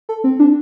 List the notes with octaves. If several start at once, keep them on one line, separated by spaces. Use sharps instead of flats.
A4
C4
D4